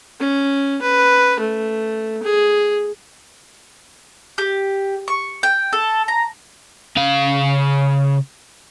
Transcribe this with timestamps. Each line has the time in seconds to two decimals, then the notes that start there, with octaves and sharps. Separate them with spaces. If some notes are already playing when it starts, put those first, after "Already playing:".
0.20 C#4
0.82 B4
1.40 A3
2.23 G#4
4.38 G4
5.08 C#6
5.43 G5
5.73 A4
6.08 A#5
6.96 C#3 F5